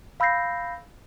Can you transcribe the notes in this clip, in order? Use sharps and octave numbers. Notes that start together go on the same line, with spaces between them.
F5 B5 E6 G6 A#6 C7